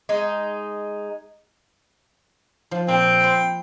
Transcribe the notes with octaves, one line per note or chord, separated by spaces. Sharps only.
G#3 D#4
F3
A#2 C4 G5
C5 B5